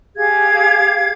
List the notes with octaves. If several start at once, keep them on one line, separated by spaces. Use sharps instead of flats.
G4 G#4 F5 G#6